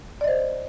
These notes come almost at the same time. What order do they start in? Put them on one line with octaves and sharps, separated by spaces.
D5 D#5 C5